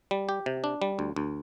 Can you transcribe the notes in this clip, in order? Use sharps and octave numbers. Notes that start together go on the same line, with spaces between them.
G3
G4
C3
D4
G3
D2
D2